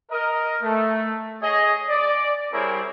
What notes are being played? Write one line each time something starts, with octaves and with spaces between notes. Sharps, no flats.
A#4 D#5
A3
G#4 C#5 D#5
D5
G3 C4 E4 G#4 A#4 C#5